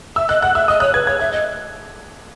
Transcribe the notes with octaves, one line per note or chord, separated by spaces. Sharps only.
E5 E6
D#5 F#6
F#5 F#6
E5 E6
D#5 D#6
C#5 F#6
B4 G#6
C#5 G#6
E5 F#6
D#5